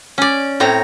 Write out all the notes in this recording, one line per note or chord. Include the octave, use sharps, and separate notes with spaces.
C#4 D5
A2 C4 C#5 A#5